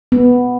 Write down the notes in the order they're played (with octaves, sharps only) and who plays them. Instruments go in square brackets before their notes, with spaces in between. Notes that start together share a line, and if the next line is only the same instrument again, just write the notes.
[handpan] B3